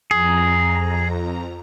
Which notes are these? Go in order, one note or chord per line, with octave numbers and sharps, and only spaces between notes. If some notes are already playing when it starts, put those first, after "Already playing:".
F2 G#4 A#5